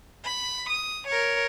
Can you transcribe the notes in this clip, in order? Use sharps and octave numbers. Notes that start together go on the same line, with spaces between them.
B5
D#6
A#4 C#5